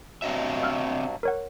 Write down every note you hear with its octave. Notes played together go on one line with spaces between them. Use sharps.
G2 B2 F#3 C4 D#5 E5
F5 E6 F6
A#4 C#5 F#5